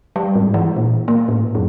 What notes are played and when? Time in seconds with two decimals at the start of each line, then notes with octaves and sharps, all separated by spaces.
0.16 G3
0.35 G#2
0.54 E3
0.77 A#2
1.08 A#3
1.28 A2
1.55 F#2